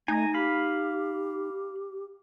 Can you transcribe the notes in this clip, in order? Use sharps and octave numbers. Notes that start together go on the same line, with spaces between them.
A3 D#4 G#5 A#5
G4 F5 B5